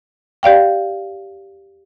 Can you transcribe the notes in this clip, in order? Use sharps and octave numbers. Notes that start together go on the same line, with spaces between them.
G4 D5 F5 G5